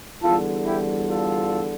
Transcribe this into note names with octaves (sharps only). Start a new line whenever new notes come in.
E2 D3 G3 F4 A4
E4 G4
F4 A4